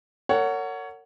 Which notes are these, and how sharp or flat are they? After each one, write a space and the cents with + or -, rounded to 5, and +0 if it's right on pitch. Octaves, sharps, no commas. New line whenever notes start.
A#4 -35 C#5 +20 F#5 +0